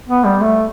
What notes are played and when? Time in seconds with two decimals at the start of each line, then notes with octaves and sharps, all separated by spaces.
0.08 B3
0.24 G3
0.41 A3